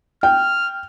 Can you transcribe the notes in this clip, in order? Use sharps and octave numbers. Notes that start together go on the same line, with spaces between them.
G5 F6